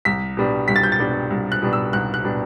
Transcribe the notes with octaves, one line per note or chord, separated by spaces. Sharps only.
C2 B6
B2 G3 D4
C2 B6
A6
G6
A6
B2 G3 D4
C2
F#6
B2 G3 D4
E6
C2 F#6
F#6
B2 G3 D4